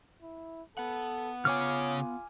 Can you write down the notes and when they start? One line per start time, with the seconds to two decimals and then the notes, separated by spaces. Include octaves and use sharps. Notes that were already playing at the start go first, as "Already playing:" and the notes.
0.22 E4
0.78 B3 A4 F#5
1.45 C#3 F4 C#5 G#5 D6 F6